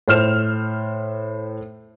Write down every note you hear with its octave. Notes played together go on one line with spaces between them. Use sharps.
A2 C5 F6 E7